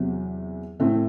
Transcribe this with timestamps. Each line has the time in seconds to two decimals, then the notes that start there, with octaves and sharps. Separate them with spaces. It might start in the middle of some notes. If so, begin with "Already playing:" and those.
Already playing: E2 C3 F#3
0.80 A2 E3 A3 C4